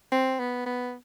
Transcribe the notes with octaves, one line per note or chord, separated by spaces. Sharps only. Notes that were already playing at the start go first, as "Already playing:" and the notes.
C4
B3
B3